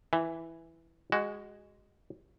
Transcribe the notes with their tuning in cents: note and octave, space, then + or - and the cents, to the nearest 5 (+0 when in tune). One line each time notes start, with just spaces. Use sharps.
E3 +0 E5 +0
G#3 -10 F#4 +15